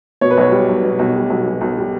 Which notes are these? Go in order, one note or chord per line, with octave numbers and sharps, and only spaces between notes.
B2 C#5
B4
B1 C#5
G3
B1
B2
B1
G3
B1
B2
B1
G3